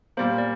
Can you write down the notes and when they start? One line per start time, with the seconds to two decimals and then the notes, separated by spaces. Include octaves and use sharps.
0.17 A#2 G3 A#3 C5
0.38 D5